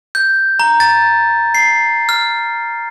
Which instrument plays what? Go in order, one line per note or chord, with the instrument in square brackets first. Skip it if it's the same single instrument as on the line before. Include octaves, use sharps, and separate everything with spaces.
[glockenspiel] G6
A#5
A6
C7
F6